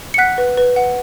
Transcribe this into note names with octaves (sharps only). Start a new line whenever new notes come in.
C#7
F#5 F#6 B6
B4
B4
F#5